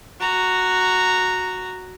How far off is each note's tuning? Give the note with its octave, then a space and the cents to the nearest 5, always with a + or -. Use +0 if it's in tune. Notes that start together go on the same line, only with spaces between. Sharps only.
F#4 +0 A#5 -10